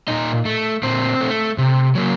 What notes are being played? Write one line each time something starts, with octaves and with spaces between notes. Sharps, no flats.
A#2 D#4 D#5
A3
A#2 C4 C5
A3
C3
F#3 A#3